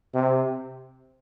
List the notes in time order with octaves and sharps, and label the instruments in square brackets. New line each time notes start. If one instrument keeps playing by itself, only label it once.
[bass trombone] C3